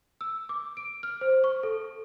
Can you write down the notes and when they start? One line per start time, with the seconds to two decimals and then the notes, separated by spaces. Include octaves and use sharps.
0.21 E6
0.49 D6
0.77 D7
1.03 F6
1.21 C5
1.44 C#6
1.63 A4